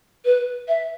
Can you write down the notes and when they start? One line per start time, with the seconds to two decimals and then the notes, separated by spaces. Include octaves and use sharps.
0.25 B4
0.68 E5